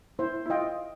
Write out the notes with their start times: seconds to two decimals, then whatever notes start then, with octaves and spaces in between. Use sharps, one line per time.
0.19 E4 C5
0.46 E4
0.50 F4 D#5 G5